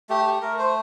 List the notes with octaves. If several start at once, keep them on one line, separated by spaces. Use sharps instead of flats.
A3 G4
G4
A3 A#4
C5